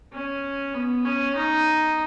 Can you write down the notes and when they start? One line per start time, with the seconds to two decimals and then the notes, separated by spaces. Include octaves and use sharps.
0.13 C#4
0.74 B3
1.05 C#4
1.36 D#4